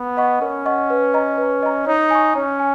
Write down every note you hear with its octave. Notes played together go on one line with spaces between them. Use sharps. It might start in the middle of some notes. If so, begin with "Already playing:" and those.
Already playing: B3
D#5 F#5 C#6
C#4 A#4
D#5 F#5 C#6
B4
D#5 A#5
B4
D#5 A#5
D#4 C#5
G#5 C#6
C#4 C#5
G#5